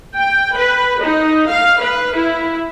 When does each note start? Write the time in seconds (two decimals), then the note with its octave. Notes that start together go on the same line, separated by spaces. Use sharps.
0.15 G5
0.55 B4
1.02 D#4
1.49 F5
1.80 B4
2.17 E4